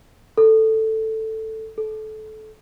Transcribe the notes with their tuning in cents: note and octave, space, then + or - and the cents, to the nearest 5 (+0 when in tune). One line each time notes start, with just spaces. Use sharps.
A4 +5
A4 -25